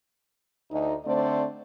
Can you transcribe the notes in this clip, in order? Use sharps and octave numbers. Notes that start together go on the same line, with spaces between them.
D2 D#4
D3 A3 C4 C5 D5